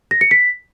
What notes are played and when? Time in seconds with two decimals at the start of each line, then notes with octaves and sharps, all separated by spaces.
0.11 A#6
0.21 C#7
0.31 B6